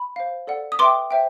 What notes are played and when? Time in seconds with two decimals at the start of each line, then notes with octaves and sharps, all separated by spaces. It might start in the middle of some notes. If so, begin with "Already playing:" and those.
Already playing: B5
0.16 C5 F5
0.47 A4 D5 F#5
0.72 D#6
0.79 B4 E5 G5 C6 D6
1.11 C5 E5 G5